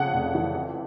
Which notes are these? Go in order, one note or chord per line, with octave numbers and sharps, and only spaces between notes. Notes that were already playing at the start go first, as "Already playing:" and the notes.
Already playing: F2 C#3 F#5
F1
E3
F2